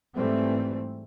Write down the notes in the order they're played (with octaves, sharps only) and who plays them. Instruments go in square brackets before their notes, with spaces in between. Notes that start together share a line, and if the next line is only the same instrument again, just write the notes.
[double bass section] G#2 E3 G3 A3 C4